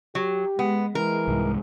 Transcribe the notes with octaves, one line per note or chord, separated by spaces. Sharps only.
F#3 G4
G#3 B3
E3 G#3 A#4
C2 G#2